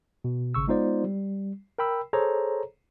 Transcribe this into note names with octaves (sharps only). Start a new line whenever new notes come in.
B2
G#1 C#3 C#6 E6
G#3 B3 D#4 F4 C5 D5
G3
A#4 G5 B5 E6
G#4 A4 C5 C#5 A#5